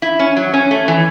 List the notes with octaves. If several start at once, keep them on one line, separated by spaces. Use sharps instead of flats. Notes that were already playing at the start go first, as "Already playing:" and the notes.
E4
C#4
F#3
C#4
A3
E3